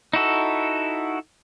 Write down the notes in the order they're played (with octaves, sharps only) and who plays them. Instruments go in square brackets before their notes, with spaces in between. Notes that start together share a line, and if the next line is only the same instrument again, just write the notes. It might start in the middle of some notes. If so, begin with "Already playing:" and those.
[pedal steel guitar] D#4 E4 F#4 A4